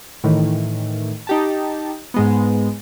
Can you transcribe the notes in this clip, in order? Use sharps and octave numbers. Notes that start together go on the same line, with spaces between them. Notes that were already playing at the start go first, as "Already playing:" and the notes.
A2 D#3 E3
D#4 G4 A5
G#2 G#3 B3